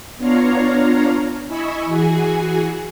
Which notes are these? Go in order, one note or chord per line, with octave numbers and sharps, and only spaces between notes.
B3 D4 F4 C#5 F5 A#5
E4 D#5 G#5 B5 C#6 E6
E3 F#4 G#4 G#5